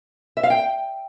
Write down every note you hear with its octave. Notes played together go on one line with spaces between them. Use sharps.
E5
F5
G5